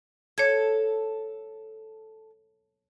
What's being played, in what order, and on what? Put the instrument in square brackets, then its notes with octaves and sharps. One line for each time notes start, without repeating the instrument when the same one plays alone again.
[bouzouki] A4 [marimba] C#5 G#6